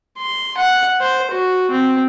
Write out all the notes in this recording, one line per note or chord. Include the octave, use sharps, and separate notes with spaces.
C6
F#5
C5
F#4
C4